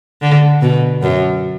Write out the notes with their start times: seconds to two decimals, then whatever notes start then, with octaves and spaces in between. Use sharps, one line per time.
0.22 D3
0.61 B2
1.02 F#2